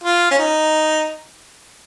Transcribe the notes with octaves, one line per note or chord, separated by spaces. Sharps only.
F4
C#4
D#4